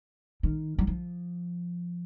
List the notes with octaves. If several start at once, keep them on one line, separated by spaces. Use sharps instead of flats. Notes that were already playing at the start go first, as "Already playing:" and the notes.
D#3
F#3
F3